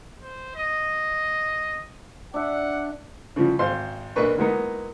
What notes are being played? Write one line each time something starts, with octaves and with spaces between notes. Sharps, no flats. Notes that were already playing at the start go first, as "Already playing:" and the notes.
C5
D#5
D4 E5 F#5
C#3 E3 F3 G3
G#1 C5 F5 C6
B1 A#3 D4 B4 C#6
E3 F#3 G#3 A#3 B3 D#4